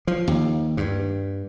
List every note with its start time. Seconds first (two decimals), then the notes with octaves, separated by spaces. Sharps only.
0.07 F3
0.28 D#2
0.77 G2